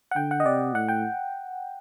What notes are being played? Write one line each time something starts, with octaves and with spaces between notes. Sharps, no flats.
F#5
D3 G5
F#5
D#5
C3 D5
A2 F#5
G5